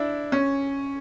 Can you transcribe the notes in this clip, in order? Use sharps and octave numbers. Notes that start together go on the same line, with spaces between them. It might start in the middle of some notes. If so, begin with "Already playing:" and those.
Already playing: D4 E4
C#4